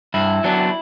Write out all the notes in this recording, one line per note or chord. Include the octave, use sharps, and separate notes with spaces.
G2 E4
F#3 B3 D4